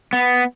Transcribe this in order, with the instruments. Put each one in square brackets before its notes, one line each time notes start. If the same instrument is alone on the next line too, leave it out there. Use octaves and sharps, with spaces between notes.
[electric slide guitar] B3